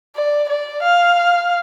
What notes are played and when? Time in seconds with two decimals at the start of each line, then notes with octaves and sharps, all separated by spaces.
0.16 D5
0.49 D5
0.83 F5